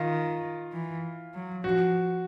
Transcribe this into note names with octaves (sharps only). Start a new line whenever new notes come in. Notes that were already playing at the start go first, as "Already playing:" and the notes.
Already playing: D#3 F4
E3
F#3
F3 F#4